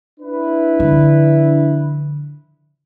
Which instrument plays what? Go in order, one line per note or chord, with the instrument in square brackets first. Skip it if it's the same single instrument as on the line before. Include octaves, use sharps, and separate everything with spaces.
[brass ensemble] D4 E4 B4
[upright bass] D3 F3